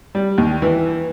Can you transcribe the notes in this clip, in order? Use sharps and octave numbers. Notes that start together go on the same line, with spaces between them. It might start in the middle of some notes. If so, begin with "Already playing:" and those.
G3
D#2
E3